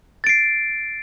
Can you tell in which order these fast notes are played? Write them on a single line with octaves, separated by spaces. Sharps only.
A6 D7 C7